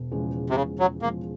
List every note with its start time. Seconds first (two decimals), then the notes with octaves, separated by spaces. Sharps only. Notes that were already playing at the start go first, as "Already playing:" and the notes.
Already playing: E1
0.11 E2 C#3 F3 G#3
0.50 C3
0.56 E1 C#3
0.80 F#3
1.02 E2 C#3 F3 G#3 A#3